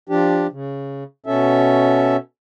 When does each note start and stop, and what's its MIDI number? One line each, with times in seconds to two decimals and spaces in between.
0.09 0.47 53
0.09 0.47 62
0.09 0.47 67
0.52 1.04 49
1.26 2.17 47
1.26 2.17 61
1.26 2.17 69
1.26 2.17 76